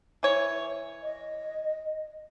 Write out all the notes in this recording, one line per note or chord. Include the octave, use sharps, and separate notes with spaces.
E3 C#5
D#5